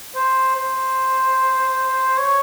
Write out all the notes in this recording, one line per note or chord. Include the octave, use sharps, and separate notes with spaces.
C5
C5
C#5